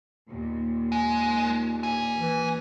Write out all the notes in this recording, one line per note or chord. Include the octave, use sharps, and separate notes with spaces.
D#2 A#2
G#3
D4 G#5
E3